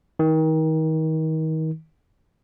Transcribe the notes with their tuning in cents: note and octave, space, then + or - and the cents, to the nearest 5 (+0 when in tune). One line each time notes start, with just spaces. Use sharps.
D#3 +30